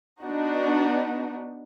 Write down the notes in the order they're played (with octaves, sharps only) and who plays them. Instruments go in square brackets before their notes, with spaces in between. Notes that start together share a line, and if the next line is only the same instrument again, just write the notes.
[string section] B3 D4 D#4 F#4